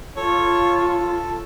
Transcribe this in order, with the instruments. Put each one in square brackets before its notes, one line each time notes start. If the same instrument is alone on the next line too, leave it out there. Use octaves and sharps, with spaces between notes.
[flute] F4 [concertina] A4 [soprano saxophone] C#5